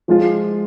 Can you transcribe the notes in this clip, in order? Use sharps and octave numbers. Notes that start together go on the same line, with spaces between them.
F3 G#3 F4